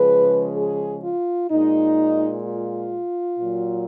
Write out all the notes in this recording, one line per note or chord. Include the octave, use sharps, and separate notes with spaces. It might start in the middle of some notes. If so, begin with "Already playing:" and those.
Already playing: C#3 F3 G#3 B4
G#4
F4
A#2 G#3 D#4
F4
A#2 F#3